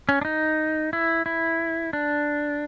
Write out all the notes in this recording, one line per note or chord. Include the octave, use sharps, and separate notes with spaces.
C#4
D4
D#4
E4
E4
D4